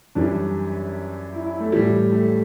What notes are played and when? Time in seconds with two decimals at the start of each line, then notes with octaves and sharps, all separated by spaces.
0.15 F#2 E3 G3 D4
1.33 E4
1.46 E4
1.60 A3
1.72 A2 E3 G3
2.12 A3